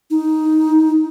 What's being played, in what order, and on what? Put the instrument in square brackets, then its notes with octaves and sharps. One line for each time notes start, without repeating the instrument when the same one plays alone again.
[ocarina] D#4